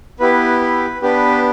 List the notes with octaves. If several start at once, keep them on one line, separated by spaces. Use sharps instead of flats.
B3 E4 G4 B4
B4
B3 D4 G4 B4